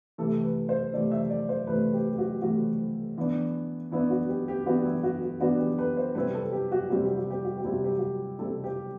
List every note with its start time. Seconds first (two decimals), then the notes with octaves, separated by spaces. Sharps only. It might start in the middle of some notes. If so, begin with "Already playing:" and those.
0.18 C3 E3 A3 A4
0.43 B4
0.69 C5
0.94 C3 E3 A3 D5
1.11 E5
1.30 D5
1.49 C5
1.67 C3 E3 A3 B4
1.93 G4
2.13 G4
2.18 F#4
2.42 C3 E3 A3 F#4
3.18 E3 B3 D4
3.91 E3 B3 D4 E4
4.10 F#4
4.29 G4
4.48 G4
4.66 E3 B3 D4 F#4
4.85 E4
5.03 F#4
5.22 F#4
5.40 E3 B3 D4 F#4
5.59 G4
5.78 B4
5.97 C5
6.15 C3 G3 C4 E4 B4
6.34 A4
6.52 G4
6.72 F#4
6.90 C3 G3 C4 E4 F#4
7.04 G4
7.16 F#4
7.30 G4
7.44 F#4
7.57 G4
7.64 C3 G3 C4 E4
7.71 F#4
7.84 G4
7.98 F#4
8.39 C3 G3 C4 E4 A4
8.64 G4